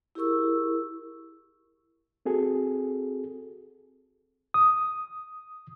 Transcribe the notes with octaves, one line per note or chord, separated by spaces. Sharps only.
E4 G4 G#4 A#4 C#6 E6
C4 F#4 G#4 A4
D#6